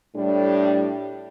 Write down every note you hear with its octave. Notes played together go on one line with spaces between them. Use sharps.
A2 G3 D4